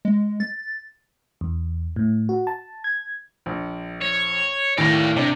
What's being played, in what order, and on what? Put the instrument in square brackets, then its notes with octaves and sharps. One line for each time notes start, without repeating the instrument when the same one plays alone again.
[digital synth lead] G#3
A6
[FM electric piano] E2
A2
F#4
A5
G#6
[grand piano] A#1
[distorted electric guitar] C#5
[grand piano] D#2 A2 A#6 [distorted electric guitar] D5 F5
[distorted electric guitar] C3 [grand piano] D4